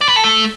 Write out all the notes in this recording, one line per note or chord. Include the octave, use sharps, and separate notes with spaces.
D5
B4
A4
A3